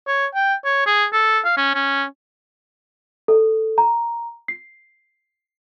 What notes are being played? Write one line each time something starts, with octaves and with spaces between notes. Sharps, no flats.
C#5
G5
C#5
G#4
A4
F5
C#4
C#4
A4
A#5
C7